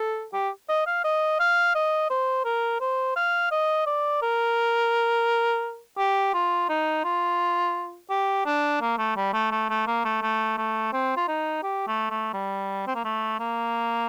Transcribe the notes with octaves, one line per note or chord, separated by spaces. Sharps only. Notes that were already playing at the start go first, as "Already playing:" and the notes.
Already playing: A4
G4
D#5
F5
D#5
F5
D#5
C5
A#4
C5
F5
D#5
D5
A#4
G4
F4
D#4
F4
G4
D4
A#3
A3
G3
A3
A3
A3
A#3
A3
A3
A3
C4
F4
D#4
G4
A3
A3
G3
C4
A#3
A3
A#3